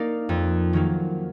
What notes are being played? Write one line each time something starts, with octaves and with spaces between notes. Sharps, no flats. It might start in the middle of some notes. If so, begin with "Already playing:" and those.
Already playing: A#3 D#4 A#4 D5 F5
F2
D#3 F#3 A#3